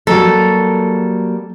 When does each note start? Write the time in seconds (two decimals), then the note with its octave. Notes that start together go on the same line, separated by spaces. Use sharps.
0.07 F#3 G3 A#3 A4